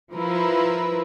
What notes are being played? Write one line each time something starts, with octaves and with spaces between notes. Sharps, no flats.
F3 E4 A#4 B4